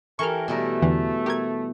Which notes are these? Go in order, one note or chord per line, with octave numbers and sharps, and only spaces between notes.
E3 G4 A4 A#4 C#6 F6
B2 G3 A3 A#4
E2 D3 E3
G4 A#4 G#6